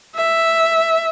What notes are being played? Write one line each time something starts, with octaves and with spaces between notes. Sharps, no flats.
E5